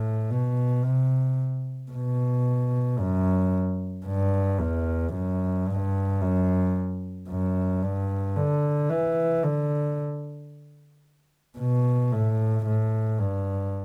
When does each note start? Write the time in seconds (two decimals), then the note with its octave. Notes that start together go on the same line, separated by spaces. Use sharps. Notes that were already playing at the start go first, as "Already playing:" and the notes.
Already playing: A2
0.31 B2
0.84 C3
1.92 B2
3.00 F#2
4.06 G2
4.60 E2
5.14 F#2
5.68 G2
6.21 F#2
7.29 F#2
7.83 G2
8.36 D3
8.90 E3
9.44 D3
11.58 B2
12.12 A2
12.66 A2
13.19 G2